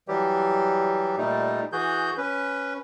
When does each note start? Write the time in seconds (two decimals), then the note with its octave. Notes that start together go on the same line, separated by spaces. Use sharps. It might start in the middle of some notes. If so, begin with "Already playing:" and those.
0.08 E3 F#3 G3 G4
1.18 A#2 G3 A3 D#4
1.72 E3 F#4 G#4 G6
2.18 C#4 B4